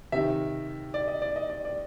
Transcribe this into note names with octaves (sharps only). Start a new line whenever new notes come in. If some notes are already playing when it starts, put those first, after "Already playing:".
C3 D#3 E5
D5
D#5
D5
D#5
D5
D5